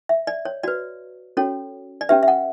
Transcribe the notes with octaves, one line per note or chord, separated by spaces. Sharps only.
E5
D5
C#5
F#4 B4 D5
C#4 F#4 A4 C#5
D5
C#4 G4 B4 E5
E5
F#5